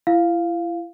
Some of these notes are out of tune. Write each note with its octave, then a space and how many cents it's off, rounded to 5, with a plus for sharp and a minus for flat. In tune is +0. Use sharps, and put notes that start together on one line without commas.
E4 +35 F5 +0